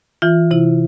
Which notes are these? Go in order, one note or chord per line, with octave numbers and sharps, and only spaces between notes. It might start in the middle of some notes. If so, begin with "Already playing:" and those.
E3 F4
C3 E4